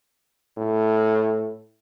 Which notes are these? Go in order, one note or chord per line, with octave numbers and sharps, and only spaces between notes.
A2